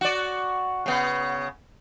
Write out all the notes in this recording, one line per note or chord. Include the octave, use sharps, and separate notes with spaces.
F#4 D5
C#3 B3